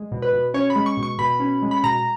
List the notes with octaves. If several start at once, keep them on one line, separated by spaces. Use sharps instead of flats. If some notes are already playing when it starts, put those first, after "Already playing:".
Already playing: G#3
B2
B4
B2
C#4 C#5
B5
G#3
C#6
B2
C#6
B2 B5
C#4
G#3
B5
B2 A#5